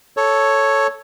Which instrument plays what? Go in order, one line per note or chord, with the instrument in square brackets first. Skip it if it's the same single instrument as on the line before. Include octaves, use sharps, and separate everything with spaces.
[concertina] A4 C#5